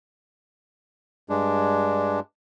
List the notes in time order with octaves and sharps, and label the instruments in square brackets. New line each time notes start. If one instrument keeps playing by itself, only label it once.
[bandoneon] G2 G#3 D4